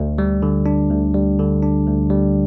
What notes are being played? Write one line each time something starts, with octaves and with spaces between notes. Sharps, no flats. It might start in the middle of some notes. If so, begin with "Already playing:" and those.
Already playing: D2
G3
D3
D4
D2
G3
D3
D4
D2
G3